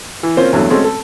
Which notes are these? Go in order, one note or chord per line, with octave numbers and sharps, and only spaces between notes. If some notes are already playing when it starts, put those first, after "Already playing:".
E3
A#3 C4 C#4 F4 C5
E2 G2 F#3 A3
G#3 A3 C4 C#4 F#4 A4
A4